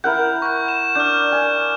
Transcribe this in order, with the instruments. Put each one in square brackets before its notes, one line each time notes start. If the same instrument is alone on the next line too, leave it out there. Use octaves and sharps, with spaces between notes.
[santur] E4 A#4 F#5 [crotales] G6
[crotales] C#6 G6
E7
[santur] D4 [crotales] F6 G6
[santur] G#5